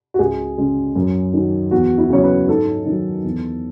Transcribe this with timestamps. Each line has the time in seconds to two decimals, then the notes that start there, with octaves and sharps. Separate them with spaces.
0.14 F#4
0.19 C#2 G#4
0.58 C#3 G#3
0.96 F#2
1.33 D#3 F#3
1.71 E2 F#4
1.98 E4
2.09 C#3 F#3 C#5
2.23 B4
2.47 G#2 A4
2.86 D#3 F#3
3.24 E2